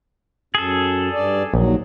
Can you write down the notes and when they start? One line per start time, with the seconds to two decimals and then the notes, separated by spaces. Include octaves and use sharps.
0.55 F#2 G#4 A4
1.13 G2 D5
1.54 A#1 D#2 F#3